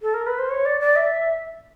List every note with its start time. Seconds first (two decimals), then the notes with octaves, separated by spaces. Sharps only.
0.02 A4
0.14 A#4
0.27 B4
0.39 C5
0.50 C#5
0.65 D5
0.80 D5
0.96 E5